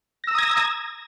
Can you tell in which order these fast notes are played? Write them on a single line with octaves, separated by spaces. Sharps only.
A#6 E6 A#5 D#6 G#6